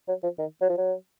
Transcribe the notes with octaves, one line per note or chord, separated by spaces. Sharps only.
F#3
F3
D#3
F#3
F3
F#3